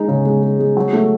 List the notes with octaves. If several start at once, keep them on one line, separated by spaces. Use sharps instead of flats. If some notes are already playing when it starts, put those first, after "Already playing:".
Already playing: G#3 D#4
C#3
G#3
G#4
G#3
F#3
A3